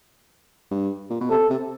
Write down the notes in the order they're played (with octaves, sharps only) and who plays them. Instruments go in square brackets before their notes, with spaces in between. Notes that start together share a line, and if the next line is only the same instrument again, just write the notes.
[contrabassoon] G2
A#2
B2
[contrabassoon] C3 [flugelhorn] A4
[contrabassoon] C3